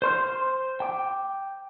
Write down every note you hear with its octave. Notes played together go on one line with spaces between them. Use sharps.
C5 C6 F6
G5 D6